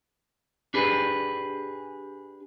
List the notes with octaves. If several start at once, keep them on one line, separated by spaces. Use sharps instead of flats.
D4 G4 G#4 B4